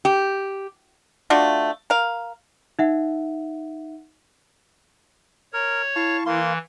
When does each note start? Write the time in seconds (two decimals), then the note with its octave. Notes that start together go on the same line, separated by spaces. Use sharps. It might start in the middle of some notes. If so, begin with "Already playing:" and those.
0.05 G4
1.30 A3 D4 F4 F#4
1.90 A#4 F5
2.79 D#4 E5 F#5
5.53 A#4 C#5
5.96 E4 F5 A5 C#6
6.26 E3 A#3 C6